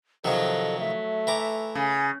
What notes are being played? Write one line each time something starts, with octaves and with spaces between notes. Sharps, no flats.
C3 D#3 F3 F#3 A4 D#5
A3 E5
E3 A#5 D6
C#3 G#5